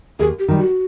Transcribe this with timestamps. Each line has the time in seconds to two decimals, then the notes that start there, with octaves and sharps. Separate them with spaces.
0.19 D#2 G#4
0.39 G4
0.48 D#3 G3
0.58 F#4